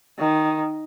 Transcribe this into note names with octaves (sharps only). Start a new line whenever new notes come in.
D#3